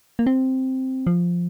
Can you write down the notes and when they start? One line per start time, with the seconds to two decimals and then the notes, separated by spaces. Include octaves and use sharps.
0.19 A#3
0.27 C4
1.07 F3